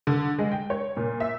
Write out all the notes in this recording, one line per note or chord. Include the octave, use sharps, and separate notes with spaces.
D3
G#3
G5
C#5
A#2
E5